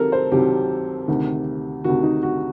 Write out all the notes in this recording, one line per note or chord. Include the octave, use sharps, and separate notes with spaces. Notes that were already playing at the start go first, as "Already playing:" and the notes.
Already playing: C2 C3 D#3 F#3 A4 A#4
C5
C2 C3 D#3 F#3 G4
D2 C3 D#3
D2 C3 D#3 F#4
D#4
F#4